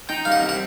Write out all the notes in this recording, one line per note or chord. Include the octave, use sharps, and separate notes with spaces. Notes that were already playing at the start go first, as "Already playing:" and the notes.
D#4 G5
G3 F5
F#5
C4
F#5